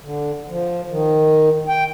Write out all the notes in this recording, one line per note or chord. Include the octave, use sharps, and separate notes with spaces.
D3
F3
D#3
G5